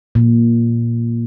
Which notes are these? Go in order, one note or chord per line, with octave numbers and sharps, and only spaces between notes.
A#2